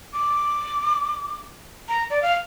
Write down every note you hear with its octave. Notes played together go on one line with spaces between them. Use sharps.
D6
A#5
D5
F5